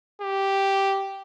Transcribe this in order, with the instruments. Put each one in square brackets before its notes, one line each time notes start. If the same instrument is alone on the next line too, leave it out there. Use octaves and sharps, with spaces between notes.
[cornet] G4